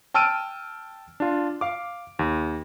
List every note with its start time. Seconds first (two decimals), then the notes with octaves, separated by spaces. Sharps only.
0.14 G5 A5 E6 F6 D7 D#7
1.20 D4 F4
1.61 F5 D6
2.19 D#2